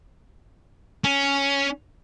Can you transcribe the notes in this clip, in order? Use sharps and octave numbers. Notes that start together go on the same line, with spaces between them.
C#4